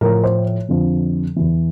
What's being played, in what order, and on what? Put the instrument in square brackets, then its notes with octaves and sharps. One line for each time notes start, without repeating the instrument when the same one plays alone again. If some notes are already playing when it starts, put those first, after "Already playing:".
[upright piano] A2 F3 A#4
C5
F2 D3 F3
E2 E3